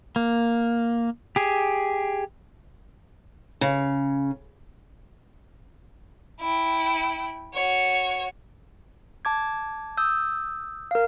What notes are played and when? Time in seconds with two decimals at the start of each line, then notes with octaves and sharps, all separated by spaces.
0.16 A#3
1.36 G4 G#4
3.61 C#3
6.41 E4 G5
7.54 F#4 C#5
9.25 A5 D6 G#6
9.97 D#6 E6 G6
10.91 A#4 F5